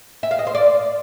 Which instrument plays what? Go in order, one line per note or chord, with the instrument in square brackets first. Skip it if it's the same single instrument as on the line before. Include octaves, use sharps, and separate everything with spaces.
[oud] E5
F5
D#5
C5
D5